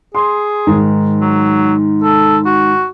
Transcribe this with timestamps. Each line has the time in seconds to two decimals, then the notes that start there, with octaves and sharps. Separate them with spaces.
0.15 G#4 C6
0.67 G#2 D#3
1.21 F#3
2.03 A4
2.46 F#4